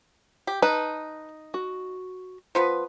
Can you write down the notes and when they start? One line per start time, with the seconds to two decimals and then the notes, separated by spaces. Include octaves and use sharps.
0.47 G4
0.62 D#4 B4 A5
1.54 F#4
2.55 F3 B3 B4